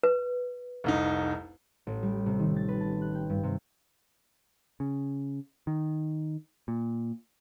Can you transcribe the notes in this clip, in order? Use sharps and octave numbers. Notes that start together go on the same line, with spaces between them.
B4
F1 C2 D#4
A1
G3
C3
D#3
A6
B4
A5
F#6
G5
G2
C3
C#3
D#3
A#2